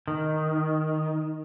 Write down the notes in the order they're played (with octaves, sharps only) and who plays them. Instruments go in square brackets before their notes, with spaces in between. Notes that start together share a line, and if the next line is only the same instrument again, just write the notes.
[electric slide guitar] D#3